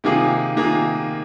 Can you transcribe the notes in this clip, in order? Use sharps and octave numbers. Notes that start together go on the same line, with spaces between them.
C3 D#3 A#3 F4 G#4
C3 D#3 A#3 F4 G#4